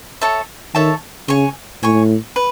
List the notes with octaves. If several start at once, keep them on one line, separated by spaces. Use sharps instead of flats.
A4 C#5 E5 A5
D#3 A4 C#5 E5 A5
C#3 C#5 G#5 C#6
A2 C#5 G#5 C#6
B4